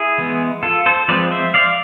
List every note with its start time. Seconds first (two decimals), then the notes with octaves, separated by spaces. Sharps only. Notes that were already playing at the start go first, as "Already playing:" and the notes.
Already playing: E4 G#4
0.18 E3 G#3 B3
0.63 F4 A4
0.86 A4 C5
1.08 F3 G#3 C4 B4 D5
1.31 C5 E5
1.54 D5 F5